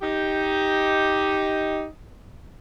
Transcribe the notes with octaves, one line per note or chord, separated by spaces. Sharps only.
D#4 G4